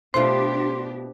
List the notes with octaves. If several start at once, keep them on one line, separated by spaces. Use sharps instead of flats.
B2 A3 D4 F4 G4 C5 C6